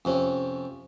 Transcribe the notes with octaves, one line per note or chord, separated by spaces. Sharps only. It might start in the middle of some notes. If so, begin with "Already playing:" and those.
F2 C3 C#4